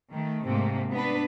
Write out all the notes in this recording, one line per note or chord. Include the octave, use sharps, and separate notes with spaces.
D#3 A3
G#2 C3 A3 A#3
B3 D4 B4